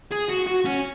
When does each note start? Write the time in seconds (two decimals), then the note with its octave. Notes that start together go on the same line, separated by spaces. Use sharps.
0.11 G#4
0.29 F#4
0.46 F#4
0.65 C#4